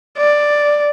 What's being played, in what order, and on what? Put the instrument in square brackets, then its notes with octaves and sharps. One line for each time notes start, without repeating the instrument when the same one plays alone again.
[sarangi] D5